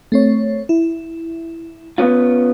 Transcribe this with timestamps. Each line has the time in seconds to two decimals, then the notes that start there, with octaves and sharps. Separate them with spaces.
0.12 A3 C4 C#5
0.69 E4
1.98 B3 C#4 F4